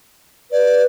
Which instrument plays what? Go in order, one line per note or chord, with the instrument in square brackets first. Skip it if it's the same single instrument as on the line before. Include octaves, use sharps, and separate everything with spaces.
[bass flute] B4 [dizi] D5